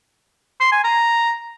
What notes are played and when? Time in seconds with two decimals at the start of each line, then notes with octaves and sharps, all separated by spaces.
0.60 C6
0.72 G#5
0.84 A#5